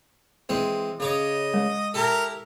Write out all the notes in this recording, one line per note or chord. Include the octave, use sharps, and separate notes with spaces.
E3 G#3 C4
C#3 C#5 D#5 D6
G#3
E4 G4 A4 A#4